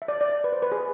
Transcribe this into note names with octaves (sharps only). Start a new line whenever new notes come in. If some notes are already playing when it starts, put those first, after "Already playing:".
E5
D5
D5
D5
B4
C5
B4
G#4